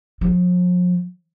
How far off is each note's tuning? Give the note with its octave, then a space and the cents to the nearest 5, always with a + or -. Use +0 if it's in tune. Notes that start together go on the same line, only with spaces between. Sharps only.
F3 +40